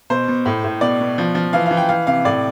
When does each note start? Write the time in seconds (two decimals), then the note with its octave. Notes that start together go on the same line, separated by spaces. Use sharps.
0.10 B2 C5
0.28 B2
0.46 A2
0.64 A2
0.81 B2 D5
1.00 B2
1.18 F3
1.35 F3
1.53 E3 F5
1.66 F5
1.71 E3
1.77 G5
1.89 E3 F5
2.07 C3 F5
2.25 A2 D5